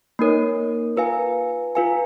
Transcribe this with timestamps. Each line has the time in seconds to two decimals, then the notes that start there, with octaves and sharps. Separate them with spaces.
0.19 A#3 D#4 A#4 C#5
0.97 F4 B4 F5 G#5
1.75 F4 B4 F5 G#5